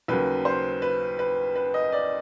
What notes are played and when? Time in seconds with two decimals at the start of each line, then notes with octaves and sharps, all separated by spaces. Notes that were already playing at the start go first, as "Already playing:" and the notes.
0.08 D#2 C#3 F#3 B4
0.45 C5
0.82 B4
1.19 B4
1.55 B4
1.74 D#5
1.92 D5